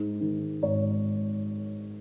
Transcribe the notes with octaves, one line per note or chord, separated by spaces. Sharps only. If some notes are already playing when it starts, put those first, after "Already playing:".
Already playing: G#2
D#3
G#1 C#5